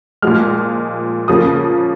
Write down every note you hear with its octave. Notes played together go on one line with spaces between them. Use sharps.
A#2 F3 G#3 F6
C#3 F3 A#3 D#6